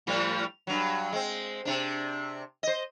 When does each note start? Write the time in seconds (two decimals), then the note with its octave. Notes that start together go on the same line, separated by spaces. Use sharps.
0.07 A2 F3 G3
0.67 G2 F#3
1.12 G#3 C4
1.65 C3 D4
2.63 C5 D#5